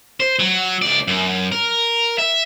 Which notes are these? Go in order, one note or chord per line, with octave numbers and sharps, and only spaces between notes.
C5
F#3
C#2 D5
F#2
A#4
E5